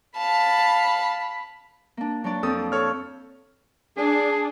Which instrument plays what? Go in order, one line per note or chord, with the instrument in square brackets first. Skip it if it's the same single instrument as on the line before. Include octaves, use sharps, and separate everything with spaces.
[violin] F5 A5 [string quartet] B5
[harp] A#3 D4
F#3 D4 D5
[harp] F2 C4 [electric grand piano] A4 D#6
[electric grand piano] A4 C#5 F6
[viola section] D4 [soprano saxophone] G#4